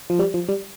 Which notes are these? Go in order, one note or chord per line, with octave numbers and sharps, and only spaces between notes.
F3
G3
F3
G3